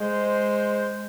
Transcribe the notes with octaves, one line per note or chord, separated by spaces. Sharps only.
G#3 C5